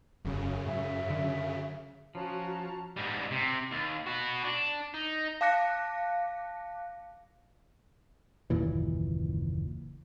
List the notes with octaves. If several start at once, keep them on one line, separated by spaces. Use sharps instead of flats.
E1 F#2 C#3
G#2 E5
D3
F3 C#4 F#4 A5 A#5
G#2 G3
C3
D#2
B3 F#4
D4
D#4
F5 A5 D6 F#6 A#6 C#7
F#1 D#2 A#2 E3